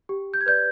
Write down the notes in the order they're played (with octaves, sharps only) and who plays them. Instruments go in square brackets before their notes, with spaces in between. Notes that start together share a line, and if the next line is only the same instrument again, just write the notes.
[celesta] G4
G6
G#6
B4 D5 G6